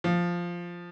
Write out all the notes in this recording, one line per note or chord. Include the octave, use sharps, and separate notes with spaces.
F3